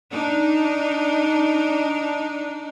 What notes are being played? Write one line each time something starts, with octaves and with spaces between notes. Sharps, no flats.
D4 D#4